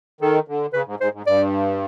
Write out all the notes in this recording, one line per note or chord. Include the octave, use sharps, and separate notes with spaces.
D#3 A4
D3
C#3 B4
G#2
G#2 C5
G#2
G2 D5